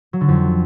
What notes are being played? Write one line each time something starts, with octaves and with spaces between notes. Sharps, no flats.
F#3
D3
F2